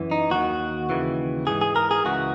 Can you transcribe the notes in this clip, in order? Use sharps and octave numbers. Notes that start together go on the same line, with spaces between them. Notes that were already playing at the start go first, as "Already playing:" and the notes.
Already playing: F#2 E3
D#4
D#2 D#3 F#4
D#2 C#3 E3
G#2 E3 G#4
G#4
A#4
G#4
C#2 C#3 E3 F#4